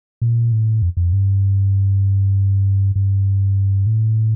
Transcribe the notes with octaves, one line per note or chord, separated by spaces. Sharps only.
A#2
A2
F2
F2
G2
G2
A2